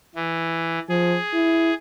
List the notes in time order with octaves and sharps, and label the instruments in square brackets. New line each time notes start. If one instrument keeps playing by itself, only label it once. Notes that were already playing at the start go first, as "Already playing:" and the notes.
[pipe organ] E3
[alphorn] F3 [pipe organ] G#4
[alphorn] E4